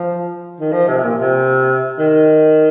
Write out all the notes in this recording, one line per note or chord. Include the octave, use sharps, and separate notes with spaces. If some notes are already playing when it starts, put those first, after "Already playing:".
Already playing: F3
D#3
F3
C3
C3
A#2
C3
D#3